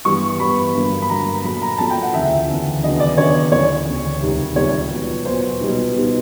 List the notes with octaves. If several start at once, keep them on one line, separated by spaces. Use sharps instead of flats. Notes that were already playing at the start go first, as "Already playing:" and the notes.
G2 E3 G3 B3 C#6
G2 E3 G3 B3 B5
G2 D3 F#3 A#3
B5
G2 D3 F#3 A#3 A#5
A#2 F#3 A3 B5
A#5
A#2 F#3 A3 A5
G5
F#5
D2 C#3 E3 E5
D2 C#3 E3
D#2 C#3 F#3 B3 D4 D#5
D5
D#2 C#3 F#3 B3 D4 C#5
D2 C#3 E3 C#5
D2 C#3 E3
C#2 C3 D#3 G3
C#2 C3 D#3 G3 C#5
A#2 F#3 B3
A#2 F#3 B3 C5
B2 G3 B3 D#4
B2 G3 B3 D#4